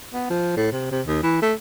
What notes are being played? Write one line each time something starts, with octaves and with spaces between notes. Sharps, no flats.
B3
F3
A2
C3
C3
D#2
E3
A3